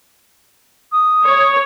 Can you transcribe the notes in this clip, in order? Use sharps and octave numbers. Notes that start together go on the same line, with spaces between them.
D#6
C#5